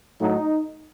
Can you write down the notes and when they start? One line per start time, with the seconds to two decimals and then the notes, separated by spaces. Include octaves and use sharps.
0.20 A2 F#3 A3 D#4